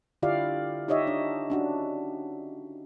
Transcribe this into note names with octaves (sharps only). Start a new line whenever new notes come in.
D3 E4 F4 G4 D5 F5
D#4 G4 C#5 D#5 E5
D4
C#4 D4 F#4